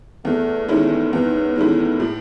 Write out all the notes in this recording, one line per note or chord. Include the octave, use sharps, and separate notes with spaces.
E2 A3
D#3 G#3 A3 C#4 E4
E2 B3
D#3 G#3 A3 C#4 E4
A2